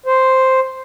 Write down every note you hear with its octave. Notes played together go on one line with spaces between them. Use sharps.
C5